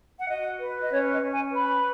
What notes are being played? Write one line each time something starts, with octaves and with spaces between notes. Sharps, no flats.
F#5
F#4 D#5
B4
D#5
C#4 C#5
D#5
C#4
G#5
B4 B5